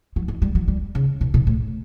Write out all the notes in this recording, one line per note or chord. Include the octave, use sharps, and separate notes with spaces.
F#3
E3
G3
F#3
G3
C#3
B2
B2
A2